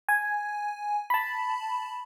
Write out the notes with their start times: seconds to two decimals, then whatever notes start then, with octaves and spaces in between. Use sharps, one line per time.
0.09 G#5
1.10 A5 B5